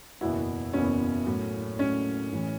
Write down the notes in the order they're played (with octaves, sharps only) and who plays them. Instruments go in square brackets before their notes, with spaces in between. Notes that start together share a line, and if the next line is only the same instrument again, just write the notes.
[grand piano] F#1 E2 B2 B3 F#4 [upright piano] E4
[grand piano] F#1 E2 B2 B3 F#4 [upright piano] C#4
[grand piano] A2 F#3 A3
[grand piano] A2 F#3 A3 [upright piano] C#4
[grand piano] A1 A2 E3